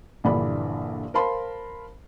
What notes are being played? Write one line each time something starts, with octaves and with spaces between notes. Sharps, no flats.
A#1 G2 D3 E3 D5 B5
A#4 C5 F5 A5 B5 C6